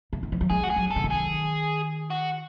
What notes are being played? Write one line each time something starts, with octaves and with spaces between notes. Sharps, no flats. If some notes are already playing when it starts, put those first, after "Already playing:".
C#3
D#3
E3
F#3
G#3 G#4
F#4
G#4
F#3
A4
C#3
D#3
G#4
F#4